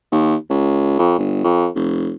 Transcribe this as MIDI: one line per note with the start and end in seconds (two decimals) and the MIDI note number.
0.12 0.36 39
0.50 0.98 37
0.99 1.15 41
1.19 1.44 31
1.44 1.68 41
1.75 2.13 29